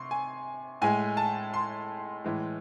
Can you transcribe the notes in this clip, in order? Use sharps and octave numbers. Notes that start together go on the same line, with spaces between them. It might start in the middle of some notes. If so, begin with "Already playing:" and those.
Already playing: C3 C6 C#6
G#5
A2 G#3 G#5
A5
C6
A2 E3 G#3